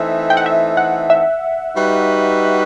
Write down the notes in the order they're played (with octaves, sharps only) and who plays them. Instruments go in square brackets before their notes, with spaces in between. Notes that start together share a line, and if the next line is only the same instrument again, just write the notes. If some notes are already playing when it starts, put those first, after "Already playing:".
Already playing: [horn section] E3 A3 C4 D#4 A4 [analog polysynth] E5
[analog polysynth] G5
F#5
E5
F#5
E5
[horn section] G3 D#4 F#4 B4